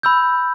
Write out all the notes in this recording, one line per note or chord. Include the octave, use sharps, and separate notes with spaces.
B5 E6 G6